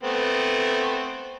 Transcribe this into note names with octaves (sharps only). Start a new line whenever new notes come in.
A3 B3 C4